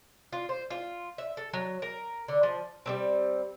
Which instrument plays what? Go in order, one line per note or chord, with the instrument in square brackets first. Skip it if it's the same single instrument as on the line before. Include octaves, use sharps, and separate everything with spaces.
[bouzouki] F4
C5
F4
E5
A4
F#3
A#4
D3
F3
G3 A#3 C4